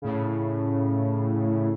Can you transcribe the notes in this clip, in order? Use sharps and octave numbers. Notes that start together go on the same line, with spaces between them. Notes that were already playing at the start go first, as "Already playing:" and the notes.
A2 C#3